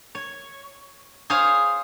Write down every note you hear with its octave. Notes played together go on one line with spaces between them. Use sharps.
C#5
G#4 C5 C#5 F5